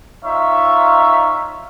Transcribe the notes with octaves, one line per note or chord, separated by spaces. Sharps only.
D#4 F4 C#5 E5